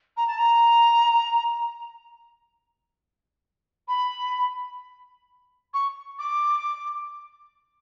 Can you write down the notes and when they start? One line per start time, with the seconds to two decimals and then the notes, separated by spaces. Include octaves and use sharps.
0.17 A#5
0.27 A5
0.38 A#5
3.88 B5
5.74 C#6
6.19 D6